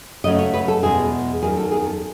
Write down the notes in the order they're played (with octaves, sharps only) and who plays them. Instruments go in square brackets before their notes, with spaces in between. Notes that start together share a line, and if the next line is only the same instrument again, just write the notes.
[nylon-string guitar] C#3 F#3 A3 D#5
C#5
B4
A4
E2 B2 G#3 G#4
E2 D#3 F#3 C#4 G#4
A4
G#4
A4